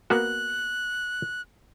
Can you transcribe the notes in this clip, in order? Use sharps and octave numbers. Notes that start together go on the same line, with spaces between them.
A#3 B3 F#4 F#6